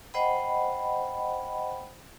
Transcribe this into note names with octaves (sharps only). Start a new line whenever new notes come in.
C5 D#5 F#5 G5 B5